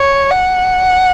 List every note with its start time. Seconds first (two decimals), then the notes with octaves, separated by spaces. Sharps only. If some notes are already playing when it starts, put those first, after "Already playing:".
Already playing: C#5
0.31 F#5